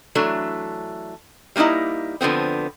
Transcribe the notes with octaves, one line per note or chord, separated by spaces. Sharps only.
E3 F#3 A3 D4
G3 A#3 C#4 D#4 E4
D3 F3 B3 C4